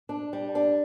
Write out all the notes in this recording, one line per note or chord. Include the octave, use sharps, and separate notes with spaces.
D4
G3
D4